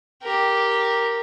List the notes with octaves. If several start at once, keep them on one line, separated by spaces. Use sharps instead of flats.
G4 A#4